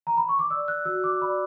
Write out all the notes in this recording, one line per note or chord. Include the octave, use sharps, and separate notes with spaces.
A#5
B5
C#6
D6
D5 E6
F#6
F#4 E6
D6
D5 B5